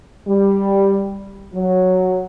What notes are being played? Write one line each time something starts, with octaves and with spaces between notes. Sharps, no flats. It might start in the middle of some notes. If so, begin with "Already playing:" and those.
G3
F#3